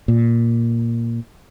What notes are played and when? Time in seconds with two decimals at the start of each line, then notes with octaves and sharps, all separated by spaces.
0.08 A#2